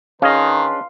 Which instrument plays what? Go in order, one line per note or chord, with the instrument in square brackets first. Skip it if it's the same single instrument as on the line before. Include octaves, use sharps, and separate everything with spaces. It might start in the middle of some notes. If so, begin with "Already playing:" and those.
[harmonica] D#3 [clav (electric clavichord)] C#4 G#4 D#5 [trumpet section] D4 B4 C6 [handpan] F5